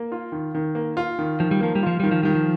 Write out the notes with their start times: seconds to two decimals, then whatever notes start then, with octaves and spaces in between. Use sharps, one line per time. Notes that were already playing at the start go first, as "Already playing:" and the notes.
Already playing: A#3
0.12 F4
0.32 D#3
0.55 D#3
0.75 A#3
0.97 F4
1.19 D#3
1.40 D#3 F3
1.51 G3
1.61 F3 A#3
1.75 G3
1.83 F3 F4
2.00 D#3 G3
2.11 F3
2.23 D#3 G3
2.35 F3